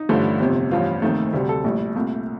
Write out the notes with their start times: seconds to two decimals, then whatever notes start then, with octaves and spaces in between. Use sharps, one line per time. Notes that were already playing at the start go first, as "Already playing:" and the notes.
Already playing: D#4
0.09 A1 G2 D3 F3 A3
0.40 G1 F2 C3
0.71 A1 G2 F3 F4
1.02 F1 D#2 D#3 A3
1.33 D2 C3 G3
1.49 A4
1.64 A#1 A2 G3
1.95 C2 A#2 A3